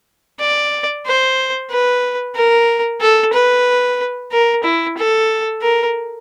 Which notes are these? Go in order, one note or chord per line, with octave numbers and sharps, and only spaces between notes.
D5
C5
B4
A#4
A4
B4
A#4
E4
A4
A#4